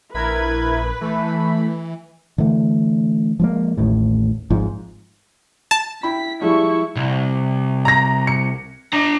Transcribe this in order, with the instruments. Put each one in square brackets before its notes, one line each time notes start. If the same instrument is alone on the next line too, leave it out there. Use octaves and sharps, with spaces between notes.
[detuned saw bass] A#1 [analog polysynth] E4 A#4 G#6 [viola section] B4 [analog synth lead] B5
[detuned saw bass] E3 [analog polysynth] A3
[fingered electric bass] D3 E3 A3
F3 G#3 A#3
A1 D#2 A2
G#1 G#2 F3
[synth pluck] A5
[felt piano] E4 G5 B5 [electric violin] B6
[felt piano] F3 G3 G#3 [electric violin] E4 C#6
[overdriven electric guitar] C2
[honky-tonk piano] A#5 A#6
C#7
[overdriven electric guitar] D4 A#5